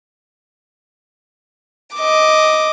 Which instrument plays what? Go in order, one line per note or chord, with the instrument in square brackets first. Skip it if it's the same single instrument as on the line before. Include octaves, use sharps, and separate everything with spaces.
[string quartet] D#5 D6